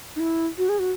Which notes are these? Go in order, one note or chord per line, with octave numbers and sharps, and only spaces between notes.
D#4
E4
F#4
G#4
F#4